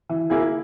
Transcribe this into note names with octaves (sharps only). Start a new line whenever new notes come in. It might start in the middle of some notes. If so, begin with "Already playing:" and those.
E3
A#3 E4 G#4